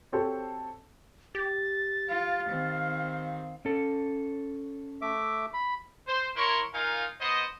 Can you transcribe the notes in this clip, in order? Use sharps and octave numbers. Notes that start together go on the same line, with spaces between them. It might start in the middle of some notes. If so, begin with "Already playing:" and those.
C4 F#4 G4 A4 C5 C#5
G4 A6
F4 F5
D#3 C4
C#4 A4
A3 E5 D6
B5
C5
E4 A#4 C#5 C6 C#6
D#4 F4 A#4 F5 G#5
B3 C5 D#5